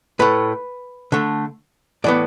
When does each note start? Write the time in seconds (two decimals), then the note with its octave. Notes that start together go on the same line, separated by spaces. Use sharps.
0.19 A2 A3 B4
1.12 D3 A3
2.04 A2 E3 B3 D5